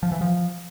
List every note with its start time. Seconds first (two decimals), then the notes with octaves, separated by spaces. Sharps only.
0.03 F3
0.12 E3
0.21 F3